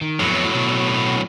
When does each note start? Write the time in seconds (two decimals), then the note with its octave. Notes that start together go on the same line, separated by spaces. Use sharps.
0.01 D#3
0.20 F2 A2 F#3 B3
0.56 B2